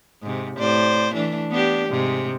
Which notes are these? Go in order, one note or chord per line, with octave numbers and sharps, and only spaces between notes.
G#2 C3
A2 C5 D5
E3 A3 D4
B3 D4 G4
G#2 C3